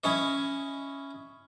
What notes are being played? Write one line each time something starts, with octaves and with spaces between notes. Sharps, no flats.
C#4 E4 C#5 D#5